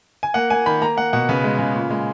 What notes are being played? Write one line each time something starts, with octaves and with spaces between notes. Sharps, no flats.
G#5
A#3 F#5
A#3 G#5
D#3 B5
A#3 A#5
A#3 F#5
B2 F#5
C#3 B4
G#3
C#3
A#2
G#3